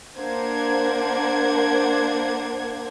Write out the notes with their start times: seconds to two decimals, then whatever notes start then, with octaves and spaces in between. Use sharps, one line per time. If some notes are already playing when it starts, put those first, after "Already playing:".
0.17 A#3 D4 C5 F#5 G#6